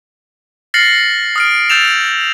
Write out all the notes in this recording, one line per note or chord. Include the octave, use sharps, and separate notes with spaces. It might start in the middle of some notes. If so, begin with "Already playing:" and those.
F6 A6 A#6 C7 C#7 F#7
D#6 F6 D7
E6 G6 A6 E7 F7